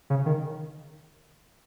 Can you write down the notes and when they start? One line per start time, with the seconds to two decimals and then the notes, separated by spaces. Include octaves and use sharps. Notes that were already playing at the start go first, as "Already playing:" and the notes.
0.10 C#3
0.26 D#3